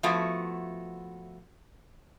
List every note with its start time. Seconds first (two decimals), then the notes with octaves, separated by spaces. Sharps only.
0.03 F3 A3 B3 E4 F#4